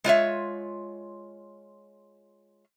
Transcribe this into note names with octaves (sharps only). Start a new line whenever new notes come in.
G#3 F4 C#5 E5